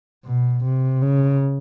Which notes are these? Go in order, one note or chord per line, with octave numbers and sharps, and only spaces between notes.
B2
C3
C#3